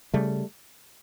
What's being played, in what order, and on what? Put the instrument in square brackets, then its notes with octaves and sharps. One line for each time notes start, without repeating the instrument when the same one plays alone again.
[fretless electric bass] C#3 G3 A3